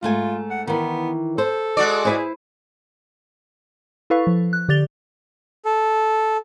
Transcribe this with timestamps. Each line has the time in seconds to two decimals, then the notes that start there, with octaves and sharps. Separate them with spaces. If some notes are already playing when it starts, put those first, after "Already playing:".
0.03 G#2 A3 F4 G#5
0.50 F#5
0.67 D#3 E3 B3
1.38 A4 C5
1.77 G#3 F#4 D5
2.05 E4 G#4 B4 C5
4.10 E4 A4 B4 F5 C#6
4.27 F3
4.53 F#6
4.69 D3 G4 D5 A6 F7 G7
5.65 A4